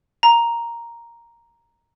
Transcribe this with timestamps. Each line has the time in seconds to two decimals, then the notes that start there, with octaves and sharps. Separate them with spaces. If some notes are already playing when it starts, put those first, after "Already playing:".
0.23 A#5